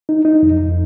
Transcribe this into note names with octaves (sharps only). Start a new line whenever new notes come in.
D#4
D#4
F2
F2